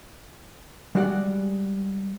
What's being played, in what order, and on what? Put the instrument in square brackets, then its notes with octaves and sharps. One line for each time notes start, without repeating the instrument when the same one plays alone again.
[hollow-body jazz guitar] G3 G#3 F#4 D5 F5 F#5